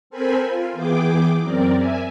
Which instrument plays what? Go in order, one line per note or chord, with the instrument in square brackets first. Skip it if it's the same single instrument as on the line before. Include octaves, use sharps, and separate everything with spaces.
[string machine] C4 A4 A#4 C5 G#5 B5
F4
E3 B3 G#4 G5 D6
F#2 C4 A#4 D5
E5 G#5